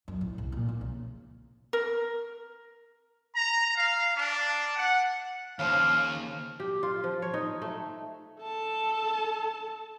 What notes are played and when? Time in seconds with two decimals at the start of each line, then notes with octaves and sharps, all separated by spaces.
0.08 F#2
0.21 A2
0.38 C2
0.52 A#2
0.69 B1
0.81 C#3
1.73 A#4
3.34 A#5
3.75 F5
4.16 D4
4.76 F#5
5.59 D#2 C#3 F3 F5 A5
6.60 G4
6.83 F4
7.04 F3
7.22 C#5
7.34 D#4
7.62 A3
8.41 A4 A5